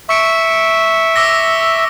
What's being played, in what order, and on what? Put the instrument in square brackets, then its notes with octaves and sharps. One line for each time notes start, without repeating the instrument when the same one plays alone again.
[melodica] E5 [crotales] C#6 C#7 D7
[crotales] D6 E6 A#6